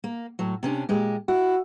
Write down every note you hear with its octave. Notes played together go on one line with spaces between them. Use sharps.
A#3
A2 F#3
C3 C#4 D4
A#2 G#3 G4
E4 F#4